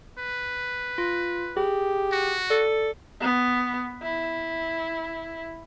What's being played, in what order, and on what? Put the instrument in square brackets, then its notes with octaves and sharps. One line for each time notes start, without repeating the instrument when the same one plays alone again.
[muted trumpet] B4
[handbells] F4
[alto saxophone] G4 [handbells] G#4
[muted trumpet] F#4
[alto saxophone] A4 [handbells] D5
[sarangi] B3
E4